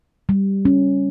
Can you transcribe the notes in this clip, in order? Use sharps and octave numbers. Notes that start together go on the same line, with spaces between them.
G3
C#4